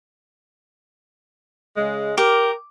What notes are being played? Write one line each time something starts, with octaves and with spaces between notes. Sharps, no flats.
C#3 G#3
G4 A#4